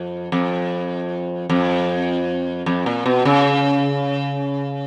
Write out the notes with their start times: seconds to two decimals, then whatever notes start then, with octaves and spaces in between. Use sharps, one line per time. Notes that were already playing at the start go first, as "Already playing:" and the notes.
Already playing: F2
0.32 F2
1.50 F2
2.66 F2
2.86 A#2
3.06 B2
3.25 C#3